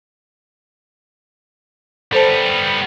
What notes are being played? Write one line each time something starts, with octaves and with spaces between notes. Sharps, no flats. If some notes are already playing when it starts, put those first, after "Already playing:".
G3 B3 A4 C5 A5